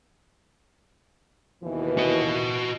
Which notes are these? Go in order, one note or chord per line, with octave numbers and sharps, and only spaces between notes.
D#2 B2 E3
F#4 D#5